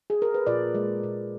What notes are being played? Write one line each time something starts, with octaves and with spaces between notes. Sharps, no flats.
G#4
A#4
B4
A#2 D5
G#3
A#2